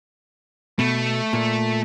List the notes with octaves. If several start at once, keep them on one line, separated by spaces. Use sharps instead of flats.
B2 A3
A#2